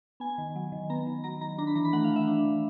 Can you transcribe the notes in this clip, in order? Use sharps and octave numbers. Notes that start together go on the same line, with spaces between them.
B3 G#5
D#3
F#3
D#3
B3 A#5
D#3
F#3 A#5
D#3 A#5
D4 A#5
B5
E3 A#5
B5
A3 F#5
F5
E3
E5
D4
E3